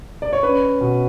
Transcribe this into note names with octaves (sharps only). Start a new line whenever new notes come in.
D5
C#5
C#4 B4
B2